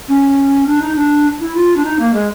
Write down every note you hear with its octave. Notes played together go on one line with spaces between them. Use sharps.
C#4
D4
D#4
D4
E4
F4
D4
D#4
A#3
G#3